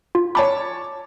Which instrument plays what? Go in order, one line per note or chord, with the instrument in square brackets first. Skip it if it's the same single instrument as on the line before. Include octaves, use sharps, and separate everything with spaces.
[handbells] F4
[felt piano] C#5 A5 D6 [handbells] B5